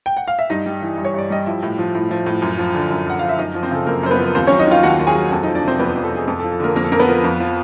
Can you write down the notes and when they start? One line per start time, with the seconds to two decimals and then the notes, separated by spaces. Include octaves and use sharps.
0.06 G5
0.17 F#5
0.28 F5
0.39 E5
0.50 G2 D#4 D#5
0.66 G3
0.82 E3
0.98 G2
1.05 C#5
1.14 G2 D5
1.30 G3 D#5
1.46 F3 E4 E5
1.63 A2
1.79 F3
1.95 A2
2.11 F3
2.26 A2
2.42 F#2
2.58 F3
2.75 D3
2.91 F#2
3.07 F#2 F#5
3.19 F3 F5
3.29 E5
3.38 F#2 D#4 D#5
3.55 F3
3.63 C4 C5
3.71 C#3 A4
3.87 F#2 A#3 A#4
4.03 F#2 C5
4.11 B3 B4
4.19 F3
4.35 D#2 C4 C5
4.47 F#3 C#4 C#5
4.59 D#4 D#5
4.67 D#3 F4 F5
4.83 D#2 F#4 F#5
4.99 D#2
5.07 G#4 G#5
5.15 F#3
5.31 F2 A4 A5
5.43 F3 D#4 D#5
5.55 D4 D5
5.64 C3 C4 C5
5.79 F2 B3 B4
5.96 F2
6.04 A4
6.12 F3 G#4
6.28 F2 A4
6.39 A4
6.44 F3
6.52 A4
6.60 D3 A#3 A#4
6.76 F2 A#3 A#4
6.84 A4
6.92 F2 A#4
6.99 B3 B4
7.08 F3
7.24 F2
7.40 F3